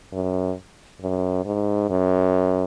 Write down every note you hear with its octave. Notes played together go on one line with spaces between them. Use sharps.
F#2
F#2
G#2
F#2